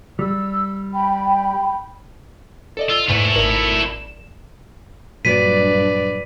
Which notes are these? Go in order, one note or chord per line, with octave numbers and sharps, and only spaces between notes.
G3 E6
G5 B5
A4 D5 D#5
F4 E6
E2 G#2 A3 E4
G#1 A#4 D5
E7
G2 A#2 F#3 B4 D5 B6 D#7